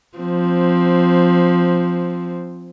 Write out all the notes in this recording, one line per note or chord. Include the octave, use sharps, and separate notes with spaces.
F3 C4